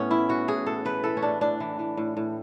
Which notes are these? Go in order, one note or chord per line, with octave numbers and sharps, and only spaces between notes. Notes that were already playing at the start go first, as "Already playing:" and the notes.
Already playing: A2 B3 C#4
E3 E4
E3 F#4
A2 G#4
A2 A4
E3 B4
E3 A4
C#4
A2 D4
A2 D4
E3
E3
A2
A2